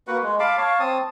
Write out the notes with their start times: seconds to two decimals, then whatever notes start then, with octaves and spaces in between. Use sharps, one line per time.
0.07 A#3 F#4 B4 F#5
0.23 G#3
0.40 F5 A5 B5 D6
0.57 C#5 F5 A5
0.80 C4 A5 D#6